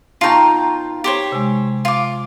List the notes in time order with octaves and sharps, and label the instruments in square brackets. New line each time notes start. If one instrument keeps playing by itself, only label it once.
[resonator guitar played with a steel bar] B2 D#4 A#5 [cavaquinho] F4 G5 [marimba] A5 C#6
[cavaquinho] G4 C5 C#5
[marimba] C3 G#3
[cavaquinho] F4 D6